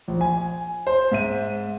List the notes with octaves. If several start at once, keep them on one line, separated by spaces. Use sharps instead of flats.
A#1
G#5
C5
G#2 E5 D#7